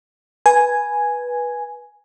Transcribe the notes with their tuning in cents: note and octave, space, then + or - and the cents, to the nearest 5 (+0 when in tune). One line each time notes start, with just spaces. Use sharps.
B4 -15 G#5 +0